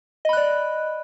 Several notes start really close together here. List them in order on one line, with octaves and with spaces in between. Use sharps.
D#5 B5 F#6 D5